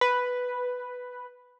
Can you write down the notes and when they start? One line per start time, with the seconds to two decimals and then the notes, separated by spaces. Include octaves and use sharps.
0.01 B4